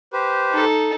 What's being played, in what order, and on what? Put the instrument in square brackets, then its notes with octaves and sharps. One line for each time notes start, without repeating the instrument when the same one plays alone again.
[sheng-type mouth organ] G4 B4 C5
[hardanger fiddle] D#4 A4